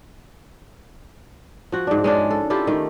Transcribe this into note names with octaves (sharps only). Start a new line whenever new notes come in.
F3 F#4
G#2 D4
G#3 C#4 D4
A4
E4 F4 G4 A4
D#3 A3